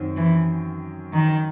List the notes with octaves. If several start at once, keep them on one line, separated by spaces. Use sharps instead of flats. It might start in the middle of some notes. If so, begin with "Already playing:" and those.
Already playing: F#2 D#3 C4
E3
D#3